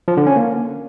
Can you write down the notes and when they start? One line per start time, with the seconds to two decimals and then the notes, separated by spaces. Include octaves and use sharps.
0.08 F3
0.17 D3
0.27 C#4
0.36 A#3